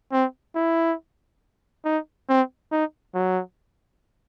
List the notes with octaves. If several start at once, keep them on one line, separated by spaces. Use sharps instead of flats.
C4
E4
D#4
C4
D#4
F#3